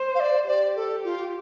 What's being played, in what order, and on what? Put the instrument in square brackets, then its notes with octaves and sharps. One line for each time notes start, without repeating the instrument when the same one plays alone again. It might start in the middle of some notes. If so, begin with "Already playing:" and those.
Already playing: [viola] C5
[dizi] F5
D5
[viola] G4 [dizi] D5
[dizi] A4
F4